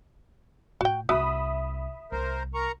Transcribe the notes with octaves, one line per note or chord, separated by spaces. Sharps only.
A2 E4 F#4 G5
C2 F#4 E5 B5 D#6
C2 A#4 C5
A#4 A#5 C#6